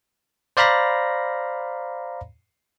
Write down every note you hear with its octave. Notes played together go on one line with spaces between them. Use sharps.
C5 D5 F5 A#5 B5 A#6